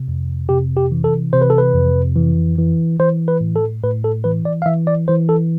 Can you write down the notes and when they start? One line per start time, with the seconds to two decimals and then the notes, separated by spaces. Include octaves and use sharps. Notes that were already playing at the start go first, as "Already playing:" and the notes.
Already playing: C3
0.08 F2
0.49 C3 G4
0.77 G4
0.91 E3
1.04 A4
1.33 C3 C5
1.42 B4
1.50 A4
1.58 B4
1.74 F2
2.16 E3
2.58 E3
2.99 E3 C5
3.28 B4
3.41 A2
3.56 A4
3.83 A2 B4
4.04 A4
4.24 E3 B4
4.45 D5
4.62 F5
4.66 E3 E5
4.87 D5
5.08 E3 C5
5.29 A4